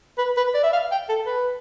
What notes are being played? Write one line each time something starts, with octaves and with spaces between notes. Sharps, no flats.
B4
B4
D5
E5
F5
G5
A4
B4